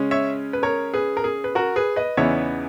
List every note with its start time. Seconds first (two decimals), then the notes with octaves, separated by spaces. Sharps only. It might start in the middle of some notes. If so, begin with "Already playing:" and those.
Already playing: C#3 G#3 C#4
0.11 C#5 E5
0.53 B4
0.63 A#4 C#5
0.94 G#4 B4
1.17 A#4
1.24 G#4
1.44 B4
1.55 F#4 A#4
1.76 G#4 B4
1.96 B4 D#5
2.17 E2 C#3 E3 B3 D#4 C#5 E5